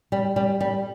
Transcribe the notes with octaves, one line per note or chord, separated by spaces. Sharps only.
G3
G3
G3